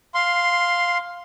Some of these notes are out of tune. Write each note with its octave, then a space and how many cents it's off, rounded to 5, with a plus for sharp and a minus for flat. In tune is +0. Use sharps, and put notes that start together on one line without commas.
F5 +5 C6 +0